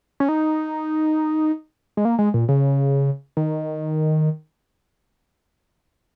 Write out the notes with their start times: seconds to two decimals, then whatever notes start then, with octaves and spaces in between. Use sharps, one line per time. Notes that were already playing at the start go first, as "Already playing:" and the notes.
0.20 C#4
0.29 D#4
1.97 G#3
2.05 A#3
2.19 G#3
2.34 A#2
2.49 C#3
3.37 D#3